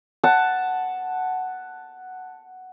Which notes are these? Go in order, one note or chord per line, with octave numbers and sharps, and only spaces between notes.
F#5 A5